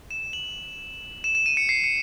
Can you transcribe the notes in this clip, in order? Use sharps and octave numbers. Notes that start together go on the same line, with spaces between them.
E7
F#7
E7
E7
D#7
C#7
C7
C#7